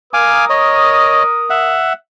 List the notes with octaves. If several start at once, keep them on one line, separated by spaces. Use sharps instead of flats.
A#4 F5 G#5 D6 D#6
C#5 D#5
E5 F#5